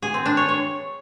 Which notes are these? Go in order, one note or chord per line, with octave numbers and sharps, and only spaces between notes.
G#4
C4
D4
C#5
C#5